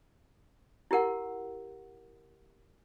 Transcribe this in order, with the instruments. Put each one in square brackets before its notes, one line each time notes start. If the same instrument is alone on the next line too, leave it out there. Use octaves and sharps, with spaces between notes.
[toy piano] E4 G4 A#4 F#5